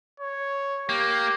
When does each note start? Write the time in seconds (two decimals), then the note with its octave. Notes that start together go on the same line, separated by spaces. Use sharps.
0.20 C#5
0.89 A#3 G4